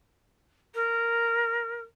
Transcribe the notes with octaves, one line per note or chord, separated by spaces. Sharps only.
A#4